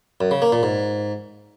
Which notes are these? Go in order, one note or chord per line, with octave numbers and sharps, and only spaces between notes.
F#2
C#3
A#3
A#2
G#2